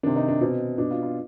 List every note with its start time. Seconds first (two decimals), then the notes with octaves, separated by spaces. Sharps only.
0.03 C3 D#3 D4
0.16 D#4
0.28 D4
0.41 B2 C4
0.78 B2 D4
0.91 F4
1.03 F4